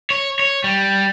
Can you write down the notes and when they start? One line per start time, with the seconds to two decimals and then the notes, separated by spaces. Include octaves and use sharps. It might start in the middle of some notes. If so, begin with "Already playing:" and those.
0.10 C#5
0.39 C#5
0.64 G3